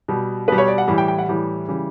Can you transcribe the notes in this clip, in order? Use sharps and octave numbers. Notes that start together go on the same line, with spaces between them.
B2 G3
B2 G3 B4
C#5
D5
F#5
A2 E3 G3
G5
G5
F#5
A2 E3 G3
C#3 E3 G3